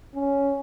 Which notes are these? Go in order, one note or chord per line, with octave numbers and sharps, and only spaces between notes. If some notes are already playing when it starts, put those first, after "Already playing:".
C#4